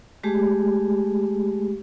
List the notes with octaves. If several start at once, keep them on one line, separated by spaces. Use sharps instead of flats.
G#3 A3 G4 G#4